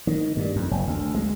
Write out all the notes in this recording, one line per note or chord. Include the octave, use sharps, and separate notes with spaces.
D#3
G2
F2
F#1
D2
G#3